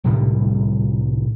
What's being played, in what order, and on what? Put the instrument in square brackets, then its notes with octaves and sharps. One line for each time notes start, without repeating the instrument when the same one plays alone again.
[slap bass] C2 A2 D3 G3